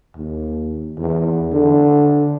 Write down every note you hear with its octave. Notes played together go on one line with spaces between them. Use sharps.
D#2
E2
D3